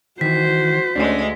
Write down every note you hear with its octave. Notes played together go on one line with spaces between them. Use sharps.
D#3 E3 F#4 C5 B6
D2 G#3 C#4 D4